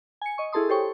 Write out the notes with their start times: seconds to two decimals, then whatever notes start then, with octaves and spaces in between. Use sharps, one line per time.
0.22 G#5 C#7
0.38 D#5 C#6
0.53 E4 G#4 A4 A5 C6 D#6
0.69 G4 A4 C5 C#5 G5 C#6